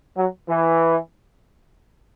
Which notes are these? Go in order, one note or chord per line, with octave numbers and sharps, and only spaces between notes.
F#3
E3